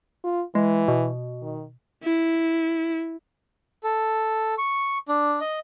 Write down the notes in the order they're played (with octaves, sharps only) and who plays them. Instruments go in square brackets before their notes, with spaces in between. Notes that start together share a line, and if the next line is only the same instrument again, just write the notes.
[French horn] F4
[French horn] E3 [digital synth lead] G#3
[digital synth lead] B2
[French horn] D#3
[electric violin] E4
[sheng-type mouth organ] A4
C#6
D4
D#5